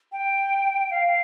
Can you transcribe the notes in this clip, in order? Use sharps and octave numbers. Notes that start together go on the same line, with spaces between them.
G5
F5